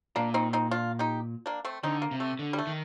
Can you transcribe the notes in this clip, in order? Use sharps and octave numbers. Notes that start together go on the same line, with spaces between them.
A#2 A#3 D4
C4 D#4
C4 D#4
D4 F4
D#4 G4
A#3 D4
A3 C4
D3 C4 D#4
A#3
C3
A3
D3
G3
A3
D#3